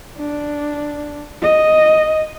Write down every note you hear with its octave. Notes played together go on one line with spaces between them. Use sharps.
D4
D#5